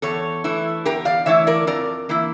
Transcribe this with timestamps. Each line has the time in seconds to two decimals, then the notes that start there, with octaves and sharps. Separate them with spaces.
0.02 E2 A4 C#5
0.44 E3 A3 E4
0.85 E2 G4 A#4
1.05 D5 F5
1.26 E3 A3 E4 C#5 E5
1.47 A#4 D5
1.67 F2 A#4 D5
2.09 E3 A#3 E4